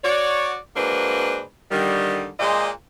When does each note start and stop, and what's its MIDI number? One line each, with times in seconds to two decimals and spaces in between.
0.03 0.56 66
0.03 0.56 73
0.03 0.56 74
0.75 1.41 54
0.75 1.41 56
0.75 1.41 58
0.75 1.41 62
0.75 1.41 71
0.75 1.41 72
1.71 2.29 50
1.71 2.29 51
1.71 2.29 55
2.39 2.69 46
2.39 2.69 56
2.39 2.69 65
2.39 2.69 72
2.39 2.69 74
2.39 2.69 75